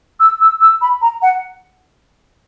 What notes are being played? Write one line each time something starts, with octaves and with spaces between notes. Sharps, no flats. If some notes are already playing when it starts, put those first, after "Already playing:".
E6
E6
E6
B5
A#5
F#5